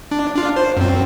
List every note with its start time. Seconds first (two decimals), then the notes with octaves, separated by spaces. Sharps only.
0.11 D4
0.35 D4 F4
0.56 C5
0.77 F#2 C4